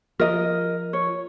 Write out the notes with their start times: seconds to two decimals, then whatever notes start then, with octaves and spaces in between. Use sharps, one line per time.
0.20 F3 A#4 D#5
0.93 C#5